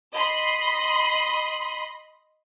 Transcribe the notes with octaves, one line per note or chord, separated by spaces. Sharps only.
D#5 B5 C6